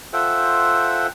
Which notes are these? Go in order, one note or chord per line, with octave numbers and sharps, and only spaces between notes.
F4 A4 C5 E5 F#5 G5